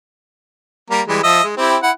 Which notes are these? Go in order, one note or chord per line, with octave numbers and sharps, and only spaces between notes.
G3 A#3 A#5
E3 G3 G#3
F3 D#5 E5
G#3
C4 E4 G4
E4 F#5